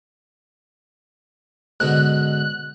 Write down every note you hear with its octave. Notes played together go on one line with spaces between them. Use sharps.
G#2 B2 D3 F#6